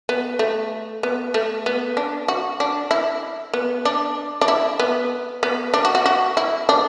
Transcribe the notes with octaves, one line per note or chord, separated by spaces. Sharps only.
B3
A3
B3
A3
B3
D4
F#4
D4
E4
B3
D4
D4
E4
B3
B3
D4
F#4
F#4
F#4
E4
D4